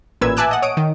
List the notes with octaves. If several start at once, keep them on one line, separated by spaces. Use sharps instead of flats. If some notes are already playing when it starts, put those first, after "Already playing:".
A1 A#2 B4 E6 G#6
E5 G#5 A5 D6 E6 F#6
D#5 F#5
C#5 D#6 D7
D#3